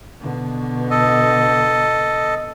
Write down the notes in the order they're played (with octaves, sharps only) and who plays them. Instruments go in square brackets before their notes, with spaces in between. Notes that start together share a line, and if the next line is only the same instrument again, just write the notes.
[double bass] B2 D3
[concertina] A4 D#5